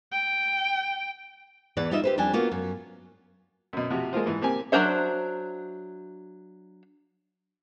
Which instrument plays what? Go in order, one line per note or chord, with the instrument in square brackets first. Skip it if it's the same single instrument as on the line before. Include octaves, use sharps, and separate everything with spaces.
[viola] G5
[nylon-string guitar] E2 E3 B4 D5 F#5
G3 D#4 F4 D#5 E5
G4 B4 C5
F2 G3 D4 G5 G#5
A#3 B3 F4 F#4
F#2
[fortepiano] F#2 B2
C3 F3 F#4 G4
G#3 A#3 F4 C5
G#2 E3
A#3 C4 G4 G#5
[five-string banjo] F#3 D4 A#4 C5 E5